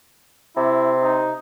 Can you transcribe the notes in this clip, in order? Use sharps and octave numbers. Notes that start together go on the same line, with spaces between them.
C3 E4
D#4